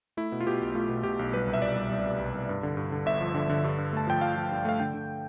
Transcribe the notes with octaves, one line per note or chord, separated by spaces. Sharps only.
A3 E4
B2
F4
B2 G4
B1
A3 F4
B2
B2 G4
B1
G3 B4
C2
E5
C2 D5
G3
C2
C2
C2
C2
G2
D3
G2
D3
G1 E5
F3
D3
D3
G2
G2
A3 A5
F3 G5
F3 F5
F3
G2
A3 F5
D3 G5
D3